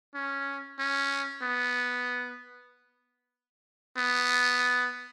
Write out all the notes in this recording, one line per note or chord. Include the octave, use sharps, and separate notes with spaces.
C#4
C#4
B3
B3